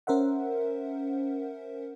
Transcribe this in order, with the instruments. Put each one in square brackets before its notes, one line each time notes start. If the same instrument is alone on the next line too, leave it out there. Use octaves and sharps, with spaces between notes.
[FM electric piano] C#4 A#4 C5 E5 F#5